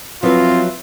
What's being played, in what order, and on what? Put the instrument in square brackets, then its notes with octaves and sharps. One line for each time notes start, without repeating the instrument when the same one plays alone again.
[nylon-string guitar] F3 F#3 [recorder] C4 [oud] E4 B4 [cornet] F4